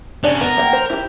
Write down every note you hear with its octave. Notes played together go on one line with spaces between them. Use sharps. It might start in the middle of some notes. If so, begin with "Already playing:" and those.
C3 C#4 D4 D5
B3 A#4
A#3 F#5 G5
C5
E4 G4